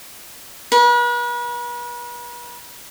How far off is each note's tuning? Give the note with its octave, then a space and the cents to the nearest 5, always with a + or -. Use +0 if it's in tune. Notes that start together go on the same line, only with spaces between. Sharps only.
B4 -40